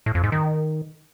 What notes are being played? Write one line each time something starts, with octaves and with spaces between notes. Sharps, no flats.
A2
F2
G#2
D#3